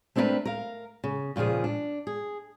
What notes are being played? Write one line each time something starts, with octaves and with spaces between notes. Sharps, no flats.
A3 C4 D4 E4 A#4 B4
A#4 F5
C#3
D#2 A#2 C#3 F3 G#4
D4
G#4